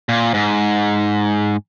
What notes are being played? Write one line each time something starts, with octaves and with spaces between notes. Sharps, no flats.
A#2
G#2